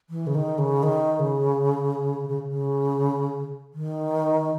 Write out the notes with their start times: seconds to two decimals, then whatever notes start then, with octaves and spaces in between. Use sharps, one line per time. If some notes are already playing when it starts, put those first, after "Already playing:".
0.10 E3
0.27 C#3
0.35 D#3
0.58 C#3
0.83 D#3
1.19 C#3
2.29 C#3
2.49 C#3
3.74 D#3